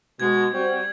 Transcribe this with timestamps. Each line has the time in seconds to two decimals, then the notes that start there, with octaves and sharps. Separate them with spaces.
0.20 B2 G#3 G#6
0.53 G3 C4 F#4